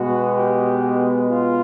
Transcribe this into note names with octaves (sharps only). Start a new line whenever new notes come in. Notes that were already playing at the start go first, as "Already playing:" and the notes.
Already playing: B2 G#3 B3 F#4
G4
F4